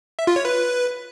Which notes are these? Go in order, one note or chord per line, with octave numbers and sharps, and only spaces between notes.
E5
F4
C#5
B4